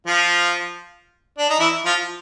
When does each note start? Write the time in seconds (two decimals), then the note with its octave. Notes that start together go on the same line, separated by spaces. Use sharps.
0.07 F3 F4
1.38 D4
1.50 D#4
1.60 E3 E4
1.86 F3 F4